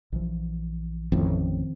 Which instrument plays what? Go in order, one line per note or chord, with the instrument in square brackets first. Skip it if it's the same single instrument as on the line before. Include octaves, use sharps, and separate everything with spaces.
[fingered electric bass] A#1 E3 F3
[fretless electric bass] A1 F2 A2 [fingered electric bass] D#3 F3 C4